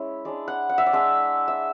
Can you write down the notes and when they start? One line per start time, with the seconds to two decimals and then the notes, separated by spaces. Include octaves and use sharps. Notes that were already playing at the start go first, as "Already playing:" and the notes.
Already playing: G#3 C#4 E4
0.25 G#3 D4 D5
0.48 F#5
0.69 F#5
0.78 E5
0.86 D5
0.93 G#3 D4 E5
1.48 E5